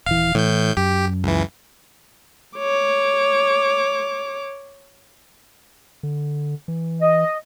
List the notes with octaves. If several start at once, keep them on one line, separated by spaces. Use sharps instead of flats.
D#1 E3 F5
A2 E3 G6
F#2 G4
C#2 E3
C#5 D6
D3
E3
D#5